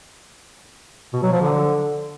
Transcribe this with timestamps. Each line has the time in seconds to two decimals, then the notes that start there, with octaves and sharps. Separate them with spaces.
1.13 B2
1.23 F#3
1.32 F3
1.41 D3